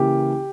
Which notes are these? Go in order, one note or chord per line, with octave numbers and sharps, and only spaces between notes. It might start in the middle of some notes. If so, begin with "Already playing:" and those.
Already playing: C#3 E3 A#3 G4